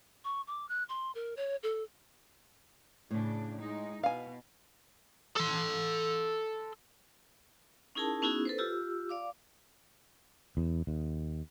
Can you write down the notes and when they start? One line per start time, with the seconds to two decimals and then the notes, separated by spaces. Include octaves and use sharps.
0.24 C#6
0.47 D6
0.69 F#6
0.89 C6
1.15 A#4
1.37 C#5
1.63 A4
3.11 A2 C#3 D4
3.58 G#3 D#4
4.03 B2 F5 G#5
5.36 A4 C6
7.95 C#4 D#4 E4 G#4 A#4 A5
8.22 B3 C#4 D#4 E4 F#4 G#4
8.45 A4 B4 C5
8.58 F4 G4 E6
9.09 D5 F5 D6
10.57 E2
10.87 D#2